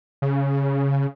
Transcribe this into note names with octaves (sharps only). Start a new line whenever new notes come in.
C#3